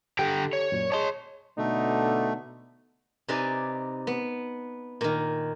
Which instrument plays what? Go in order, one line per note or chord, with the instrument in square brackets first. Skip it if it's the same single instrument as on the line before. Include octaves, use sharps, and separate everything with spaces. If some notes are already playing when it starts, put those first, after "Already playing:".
[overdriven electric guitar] D3 G5 [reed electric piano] G4 A4
[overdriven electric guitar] C#5
[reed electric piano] F#2 A#2
[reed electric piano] G#4 D#5 A5 [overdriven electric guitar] C#5 C6
[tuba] B2 [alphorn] D3 [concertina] A3 [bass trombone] D#4
[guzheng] C3 D#4 B4 D5 G#5
B3
A#2 D#3